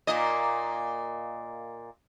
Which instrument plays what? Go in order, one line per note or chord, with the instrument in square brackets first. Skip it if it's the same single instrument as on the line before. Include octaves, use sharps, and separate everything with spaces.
[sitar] A#2 A#3 D#5